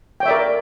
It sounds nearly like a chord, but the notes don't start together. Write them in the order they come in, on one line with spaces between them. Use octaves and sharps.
G5 C#5 E5 D5 A#4